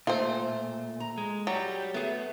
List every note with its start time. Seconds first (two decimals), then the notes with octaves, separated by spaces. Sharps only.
0.07 A#2 A3 F4 C5
1.00 A#5
1.18 G#3
1.47 F#3 G3 G4
1.94 A3 B3 G#4